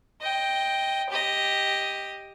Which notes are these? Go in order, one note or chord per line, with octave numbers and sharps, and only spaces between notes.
D#5 G5
G4 D#5